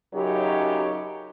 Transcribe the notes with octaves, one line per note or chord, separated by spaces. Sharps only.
F#2 C#3 F#3 D#4 G4 C#5